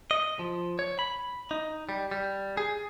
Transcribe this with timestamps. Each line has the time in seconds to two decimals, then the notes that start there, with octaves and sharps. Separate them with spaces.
0.11 D#5
0.39 F3
0.79 C#5
0.99 B5
1.51 D#4
1.89 G3
2.11 G3
2.57 G#4